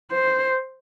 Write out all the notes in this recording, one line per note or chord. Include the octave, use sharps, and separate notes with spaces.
C5